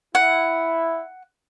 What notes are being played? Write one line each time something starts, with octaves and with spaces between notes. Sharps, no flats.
E4 F#5